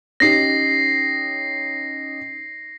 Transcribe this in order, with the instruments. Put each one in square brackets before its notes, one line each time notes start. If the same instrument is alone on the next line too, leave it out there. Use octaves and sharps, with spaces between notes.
[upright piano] C#4 D#4 G4 [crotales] A#6 C7